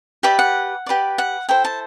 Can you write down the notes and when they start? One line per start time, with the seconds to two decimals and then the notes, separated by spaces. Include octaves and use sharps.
0.23 G4 B4 D5 E5
0.39 F#5
0.86 G4 B4 D5
1.18 F#5
1.49 E4 A4 C5 G5
1.65 A5